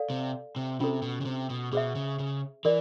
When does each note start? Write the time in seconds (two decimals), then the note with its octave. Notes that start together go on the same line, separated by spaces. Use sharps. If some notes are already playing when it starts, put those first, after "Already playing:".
Already playing: A4 D5 F5
0.10 C3
0.56 C3
0.80 C3 C#4 F4 A4
1.02 B2
1.21 C#3
1.25 C3
1.50 B2
1.72 B2 G#4 C5 E5
1.95 C#3
2.19 C#3
2.65 E3 A#4 D5